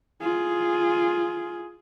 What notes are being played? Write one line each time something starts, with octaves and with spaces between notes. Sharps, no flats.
F4 G#4